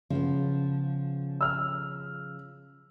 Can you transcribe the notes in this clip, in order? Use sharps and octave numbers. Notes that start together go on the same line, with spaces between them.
C#3 F3 B3
E6 F6